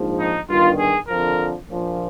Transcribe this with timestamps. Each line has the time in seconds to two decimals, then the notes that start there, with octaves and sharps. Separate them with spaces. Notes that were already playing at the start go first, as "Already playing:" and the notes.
Already playing: A#1 G#2 F3
0.20 D#4
0.49 G1 G2 D#3 F4
0.79 G#4
1.08 F2 D3 F3 A#4
1.68 A#1 A#2 F3